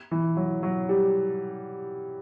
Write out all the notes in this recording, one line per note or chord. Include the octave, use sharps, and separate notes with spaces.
E3
F#3
F#3
G3